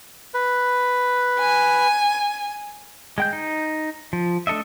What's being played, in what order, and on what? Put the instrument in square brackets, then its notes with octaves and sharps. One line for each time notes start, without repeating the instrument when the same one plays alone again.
[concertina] B4
[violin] G#5
[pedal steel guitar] G#3 G5 G6
D#4
F3
A3 D4 A4 D#5 E5